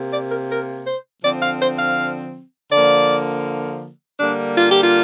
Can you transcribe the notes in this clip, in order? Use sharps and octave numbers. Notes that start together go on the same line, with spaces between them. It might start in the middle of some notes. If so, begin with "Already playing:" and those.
Already playing: C3 A#3
D5
A#4
A#4
C5
D3 F3 C4 D5
F5
C5
F5
D3 F3 A#3 D5
D3 G3 A#3 D4
F4
G4
F4